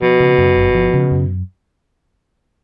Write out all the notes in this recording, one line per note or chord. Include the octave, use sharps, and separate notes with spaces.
B2 F3
C#3
F#2
G1
F3
C#3
F#2